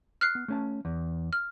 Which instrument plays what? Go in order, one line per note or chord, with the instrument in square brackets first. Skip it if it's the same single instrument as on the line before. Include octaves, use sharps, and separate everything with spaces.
[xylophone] F6 F#6 C7
[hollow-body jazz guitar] B3
A3 C#4 A5
E2
[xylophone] F6